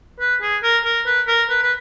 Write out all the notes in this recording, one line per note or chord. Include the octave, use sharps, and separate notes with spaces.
B4
G#4
A#4
A#4
B4
A#4
B4
B4